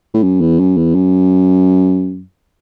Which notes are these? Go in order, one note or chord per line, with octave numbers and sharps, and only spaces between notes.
A2
F#2
E2
F#2
E2
F#2